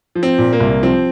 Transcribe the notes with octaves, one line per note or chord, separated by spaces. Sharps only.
F3
C4
A#2
A#3
C2
F3 C4